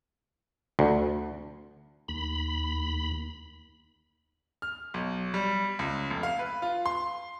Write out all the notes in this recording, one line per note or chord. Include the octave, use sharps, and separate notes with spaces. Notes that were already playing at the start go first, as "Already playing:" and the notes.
D2
D#2 B5
F6
B1
G3
C#2
F1
F5
B4
F4
C6